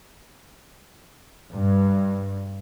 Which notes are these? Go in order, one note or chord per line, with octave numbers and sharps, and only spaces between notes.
G2